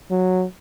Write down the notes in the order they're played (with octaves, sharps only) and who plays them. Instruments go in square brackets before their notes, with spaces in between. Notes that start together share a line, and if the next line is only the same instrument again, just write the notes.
[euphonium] F#3